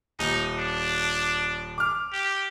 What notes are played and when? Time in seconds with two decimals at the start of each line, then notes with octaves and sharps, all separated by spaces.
0.19 D#1 D#4
0.58 D4
1.78 D6 F6
2.13 G4